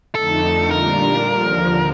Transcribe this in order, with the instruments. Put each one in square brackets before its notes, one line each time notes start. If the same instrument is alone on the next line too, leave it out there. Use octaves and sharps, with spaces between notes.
[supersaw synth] F2 D3 A3 D#4 [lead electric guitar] A4
[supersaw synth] A#2 G3 D4 F4 [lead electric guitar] A#4
[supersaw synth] D#2 D3 F3